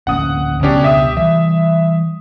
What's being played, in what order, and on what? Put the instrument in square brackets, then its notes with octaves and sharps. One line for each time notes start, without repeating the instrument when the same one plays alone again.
[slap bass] D1 A#1 C#4 [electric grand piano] F#5 D#6
[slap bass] C#2 B2 [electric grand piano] C#4 D4 G4
[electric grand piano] G4 E5 D#6
[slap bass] E3 G3 [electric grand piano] E5